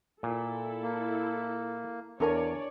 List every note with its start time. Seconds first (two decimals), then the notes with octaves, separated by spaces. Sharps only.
0.23 A#2 E4 A4
0.82 A#3
2.20 E2 D4 A#4 C#5 D5 G#5